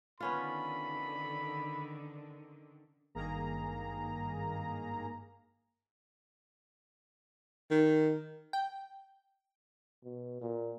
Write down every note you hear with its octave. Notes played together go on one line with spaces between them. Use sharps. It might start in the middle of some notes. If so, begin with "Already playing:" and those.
D3 D#3 B3 C#4 F4 B5
G#1 G2 D#3 A#3 G#4 A#5
D#3
G5
B2
A#2